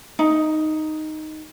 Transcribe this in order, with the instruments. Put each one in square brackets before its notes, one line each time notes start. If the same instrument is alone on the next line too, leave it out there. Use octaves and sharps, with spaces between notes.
[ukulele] D#4